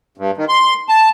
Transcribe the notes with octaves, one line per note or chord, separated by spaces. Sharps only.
G2
D#3
C6
A5